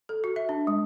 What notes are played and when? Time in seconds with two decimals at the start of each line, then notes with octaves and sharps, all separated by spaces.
0.09 A4
0.24 F#4
0.36 E5
0.49 D4
0.67 G#3